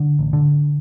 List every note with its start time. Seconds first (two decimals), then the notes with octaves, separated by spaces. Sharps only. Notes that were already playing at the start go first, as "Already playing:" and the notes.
Already playing: D3
0.19 A1
0.33 D3